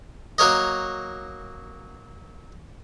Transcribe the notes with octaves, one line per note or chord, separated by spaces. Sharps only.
F#3 A#3 A#4 C#5 D#5